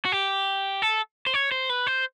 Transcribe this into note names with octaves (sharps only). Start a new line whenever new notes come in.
F#4
G4
A4
C5
C#5
C5
B4
C5